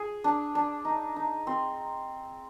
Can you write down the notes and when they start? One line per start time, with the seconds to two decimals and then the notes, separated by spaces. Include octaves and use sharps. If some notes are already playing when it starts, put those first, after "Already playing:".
Already playing: G#4
0.24 D4
0.55 D4
0.85 D#4
1.16 D#4
1.47 C4